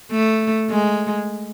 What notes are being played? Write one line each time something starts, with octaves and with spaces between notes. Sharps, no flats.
A3
G#3